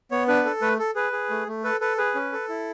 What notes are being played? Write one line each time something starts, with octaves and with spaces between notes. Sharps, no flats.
B3 C#5
D4 B4
A4
A3 B4
A4
G#4 B4
G#4
A3
A3
A4 B4
A4 B4
G#4 B4
C#4
A4
E4